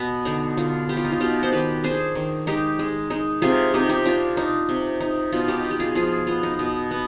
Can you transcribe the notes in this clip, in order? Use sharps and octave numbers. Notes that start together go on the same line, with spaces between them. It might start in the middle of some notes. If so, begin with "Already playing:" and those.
Already playing: B2 B3
D3 D#4
D3 F4
B3 G4
F4
D#4
F4
B2 D#4 G4
C5
D#3 G4 B4
D4 G#4 C5
D#3
G#3 D#4 G4
G#3
G#3 D#4
C3 F4 G#4
C3 D#4 G4
D#4 G4
D4 F4
D4 D#4
C3
D#4
B2 F4
D#4 G4
B2
G4
F4 G#4
F3 F4 G#4
B3 F4
D#4
B2
B3